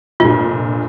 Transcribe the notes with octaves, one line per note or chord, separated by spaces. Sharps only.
F1 G2 A#2 F4